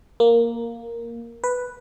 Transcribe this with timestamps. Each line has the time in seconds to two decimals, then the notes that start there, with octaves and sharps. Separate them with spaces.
0.20 A#3
1.44 B4